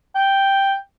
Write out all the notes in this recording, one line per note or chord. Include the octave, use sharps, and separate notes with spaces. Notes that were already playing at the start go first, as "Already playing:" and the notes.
G5